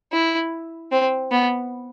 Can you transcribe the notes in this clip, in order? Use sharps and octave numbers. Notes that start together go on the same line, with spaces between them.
E4
C4
B3